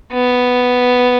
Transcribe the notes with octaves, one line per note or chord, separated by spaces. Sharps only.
B3